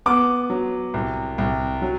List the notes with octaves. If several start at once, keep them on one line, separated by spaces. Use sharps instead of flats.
B3 D6
F#3
C2
C2
F#3